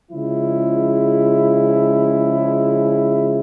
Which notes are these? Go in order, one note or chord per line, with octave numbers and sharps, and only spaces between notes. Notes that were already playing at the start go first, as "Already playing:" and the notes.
C#3 F3 G#3 E4